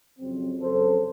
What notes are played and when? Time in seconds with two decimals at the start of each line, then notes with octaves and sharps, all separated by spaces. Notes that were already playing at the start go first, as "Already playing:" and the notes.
0.19 F2 C#3 F#3 C4
0.60 F#2 C#3 F#3 C4 A4 C5